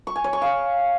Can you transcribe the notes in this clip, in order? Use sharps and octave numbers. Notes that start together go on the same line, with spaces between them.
C#6
G#5
C#5
C#6
F5